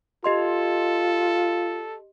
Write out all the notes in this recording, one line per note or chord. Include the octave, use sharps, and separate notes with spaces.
F4 G4 A4 D#5 C6